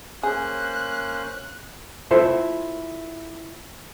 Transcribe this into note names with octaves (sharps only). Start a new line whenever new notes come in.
A#3 C#4 G#4 C5 F#6
E4 F4 A4 C5 E5